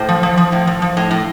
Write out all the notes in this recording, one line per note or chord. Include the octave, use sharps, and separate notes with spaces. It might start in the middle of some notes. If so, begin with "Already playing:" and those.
Already playing: A2 C5
F3
F3
F3
A2
F3
F3
A2
A2